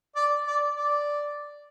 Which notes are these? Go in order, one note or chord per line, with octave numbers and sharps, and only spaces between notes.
D5
D5
D5